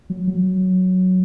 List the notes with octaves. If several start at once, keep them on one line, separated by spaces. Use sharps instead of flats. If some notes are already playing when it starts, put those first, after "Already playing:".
F#3
F#3